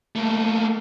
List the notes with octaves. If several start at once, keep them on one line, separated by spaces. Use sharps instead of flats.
A3 A#3